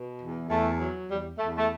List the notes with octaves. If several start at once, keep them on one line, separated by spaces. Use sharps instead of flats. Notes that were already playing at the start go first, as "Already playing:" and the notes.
Already playing: B2
E2
E2 A3
F#3
E2 G3
E2 A3
A3